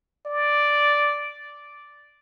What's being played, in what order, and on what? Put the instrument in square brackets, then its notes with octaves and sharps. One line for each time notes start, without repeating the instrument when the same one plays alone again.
[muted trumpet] D5